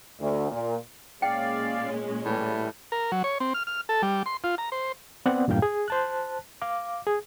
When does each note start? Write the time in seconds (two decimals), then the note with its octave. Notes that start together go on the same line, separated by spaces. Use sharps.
0.20 D2
0.51 A#2
1.22 A#2 G#3 C#4 D5 F5 G5
2.25 A2 E3 G3
2.92 A#4
3.12 F#3
3.24 C#5
3.40 C4
3.54 F6
3.67 F6
3.89 A4
4.02 G3
4.26 C6
4.44 F4
4.58 A#5
4.72 C5
5.26 B3 C4 D5 F#5
5.48 E2 G2 A#2 F5 G5
5.62 G#4
5.88 C5 A5 F#6
6.62 F5 D6
7.07 G#4